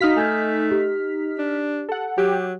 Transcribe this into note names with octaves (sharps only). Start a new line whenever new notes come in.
D#4 F#4 F5 F6 B6
A3 G#5 G6 G#6
G4
D4
A4 F#5
F#3 G4